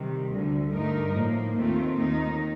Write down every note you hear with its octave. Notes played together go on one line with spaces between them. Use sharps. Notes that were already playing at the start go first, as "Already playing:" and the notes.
Already playing: C3 D#3 G3
D2 D3 G3
G2 D3 A3 D#4 A#4
A2 F3 A#3
D#2 D#3 A3 C4 F4
D#2 D#3 A#3 D#4